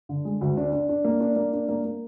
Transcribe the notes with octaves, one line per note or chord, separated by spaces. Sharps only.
D3
G#3
D2
D4
D4
D4
A#3
D4
A#3
D4
A#3
A#3